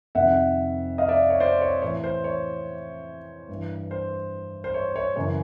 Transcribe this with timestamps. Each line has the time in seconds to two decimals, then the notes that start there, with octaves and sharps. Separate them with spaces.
0.15 F2 C3 D#3 E5 F#5
0.98 D#5 F5
1.09 D5 E5
1.30 C#5
1.40 C5 D5
1.61 C#5
1.82 A2 E3 C#5
2.04 C5
2.24 C#5
3.49 G2
3.54 E3
3.91 C5
4.64 C5
4.74 C#5
4.96 C#5
5.16 F#2 C#3 E3 C#5